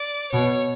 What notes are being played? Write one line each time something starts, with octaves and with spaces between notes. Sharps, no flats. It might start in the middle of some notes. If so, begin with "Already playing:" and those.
Already playing: D5
B2 C#5